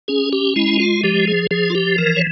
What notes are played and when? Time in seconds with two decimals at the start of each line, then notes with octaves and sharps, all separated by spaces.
0.08 C#4 G#4
0.33 G4
0.56 G#3 E4
0.80 F4
1.04 F3 G4
1.27 G#4
1.51 F3 G#4
1.70 F4
1.75 G4
1.98 E3 A#4
2.16 C#5